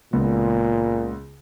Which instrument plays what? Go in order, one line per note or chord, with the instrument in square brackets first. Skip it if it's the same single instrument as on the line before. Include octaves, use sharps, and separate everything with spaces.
[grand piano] C#2 B3 [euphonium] A#2